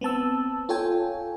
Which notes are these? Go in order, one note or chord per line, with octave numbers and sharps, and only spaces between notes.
B3 C4 A5 E6
F4 A4 C#5 G5 G#5